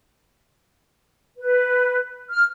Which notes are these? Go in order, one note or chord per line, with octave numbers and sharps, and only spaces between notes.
B4
F6